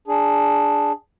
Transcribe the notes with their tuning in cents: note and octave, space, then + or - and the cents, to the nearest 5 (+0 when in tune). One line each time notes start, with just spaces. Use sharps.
D4 +0 G#4 +0